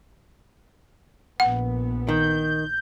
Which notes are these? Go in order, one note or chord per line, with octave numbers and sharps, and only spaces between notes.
A#1 B3 F#5
D#3 G6